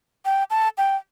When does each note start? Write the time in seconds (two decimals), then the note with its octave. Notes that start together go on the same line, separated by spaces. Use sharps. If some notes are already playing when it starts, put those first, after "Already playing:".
0.25 G5
0.50 A5
0.78 G5